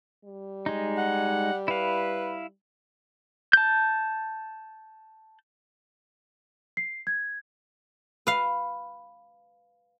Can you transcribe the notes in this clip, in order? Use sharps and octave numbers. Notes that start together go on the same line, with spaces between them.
G3
G#3 D#4
F#5
E4 B4 F5
A5 G6
C7
G#6
B4 F5